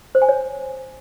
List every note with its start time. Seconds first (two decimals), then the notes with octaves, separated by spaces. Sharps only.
0.15 C5
0.22 G#5
0.29 C#5